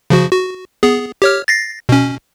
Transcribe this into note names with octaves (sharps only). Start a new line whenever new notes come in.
C#3 F3 F#4
F#4
B3 G#4
G4 C#5 F6
A6 A#6 C7
B2 C#4